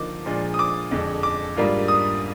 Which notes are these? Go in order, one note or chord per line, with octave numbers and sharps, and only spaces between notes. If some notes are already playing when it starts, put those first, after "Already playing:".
Already playing: D3 F3 A#3 D#4 D6
A#2 F3 G#3 D4
D#6
D6
F2 D3 G#3
D6
G#2 G3 A#3 D4 F4
D#6